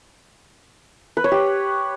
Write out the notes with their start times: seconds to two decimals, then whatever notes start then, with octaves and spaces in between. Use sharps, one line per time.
1.17 B4
1.24 C#5
1.32 G4